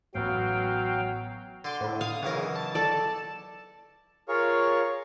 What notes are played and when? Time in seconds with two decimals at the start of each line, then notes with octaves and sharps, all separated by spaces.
0.14 A1 F#3 B3 F#4 F5 G5
1.64 D3 C6 D6
1.81 A2
2.01 F5 D#6
2.23 B1 C#3 E3 A#4
2.55 A5
2.75 A4 D5
4.28 F4 G#4 A#4 C#5 F5 C#6